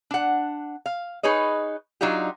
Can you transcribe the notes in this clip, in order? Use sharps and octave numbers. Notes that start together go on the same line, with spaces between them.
D4 F#5
F5
D#4 G#4 B4 C#5 D#5
F#3 D4 D#4 F4 G4